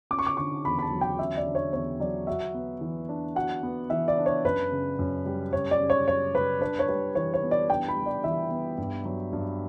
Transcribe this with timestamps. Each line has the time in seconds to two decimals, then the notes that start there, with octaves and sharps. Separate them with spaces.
0.11 C#4 D6
0.19 C#6
0.27 D6
0.37 D3 C#6
0.65 E2 B5
0.79 B5
0.82 A5
0.91 F#3
1.01 G5
1.19 C#4 E5
1.37 D5
1.46 D3
1.55 C#5
1.73 E2 C#5
2.00 F#3 D5
2.27 F#4 E5
2.54 B3
2.81 E3
3.09 D4
3.35 F#4 F#5
3.63 B3
3.90 E3 E5
4.08 D5
4.17 D4
4.26 C#5
4.44 F#2 B4
4.72 C#3
4.99 F#2
5.26 G3
5.53 F#2 C#5
5.71 D5
5.80 C#3
5.90 C#5
6.07 F#2 C#5
6.34 G3 B4
6.61 D4 B4
6.79 C#5
6.89 G3 B4
7.15 E3 C#5
7.34 C#5
7.43 B3
7.51 D5
7.70 D4 G5
7.88 B5
7.97 G3
8.06 D5
8.24 E3 E5
8.51 B3
8.78 G2
9.05 F#3
9.33 G2